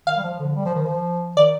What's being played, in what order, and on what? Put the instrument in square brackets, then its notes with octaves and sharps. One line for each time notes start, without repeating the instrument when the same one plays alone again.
[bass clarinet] D#3 [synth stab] F5
[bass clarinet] G3
F3
D3
G3
F3
D#3
F3
[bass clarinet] D#3 [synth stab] D5